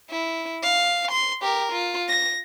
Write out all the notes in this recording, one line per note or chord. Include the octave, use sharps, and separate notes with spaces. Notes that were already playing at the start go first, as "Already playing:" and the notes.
E4
F5
C6
G4 A#4
F4
A#6